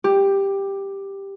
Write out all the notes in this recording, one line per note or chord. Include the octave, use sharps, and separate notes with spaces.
G4